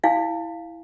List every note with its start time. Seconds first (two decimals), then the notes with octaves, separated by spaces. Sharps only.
0.04 E4 F5 G#5